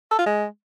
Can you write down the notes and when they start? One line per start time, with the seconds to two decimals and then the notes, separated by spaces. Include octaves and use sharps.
0.11 A4
0.19 F4
0.26 G#3